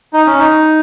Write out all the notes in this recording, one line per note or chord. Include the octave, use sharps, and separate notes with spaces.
D#4
C#4
D#4